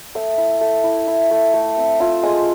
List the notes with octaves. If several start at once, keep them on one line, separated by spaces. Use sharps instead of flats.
A3 D#6
E4
A3
E4
E4
A3
A3
C4
F4 E6
G#3 D#6